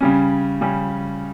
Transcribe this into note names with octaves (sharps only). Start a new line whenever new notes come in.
C#3 G3 C#4
C#3 G3 C#4